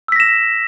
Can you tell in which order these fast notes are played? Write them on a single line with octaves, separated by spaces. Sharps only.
E6 B6 A#6 E7